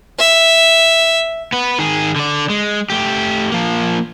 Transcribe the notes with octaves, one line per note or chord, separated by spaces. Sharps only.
E5
B3 B4
D#3 G#4
D3 D5
G#3
A3 G4
F3 A#3